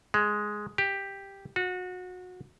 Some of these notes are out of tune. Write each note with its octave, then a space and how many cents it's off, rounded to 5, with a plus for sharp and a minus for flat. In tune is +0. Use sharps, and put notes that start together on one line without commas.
G#3 +5
G4 +5
F#4 -25